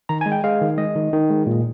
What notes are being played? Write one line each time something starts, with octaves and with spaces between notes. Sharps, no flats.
D#3 A#5
G#5
G#3
G5
G#3 F5
D#3
G#3 D#5
D#3
D#3
G#3
A#2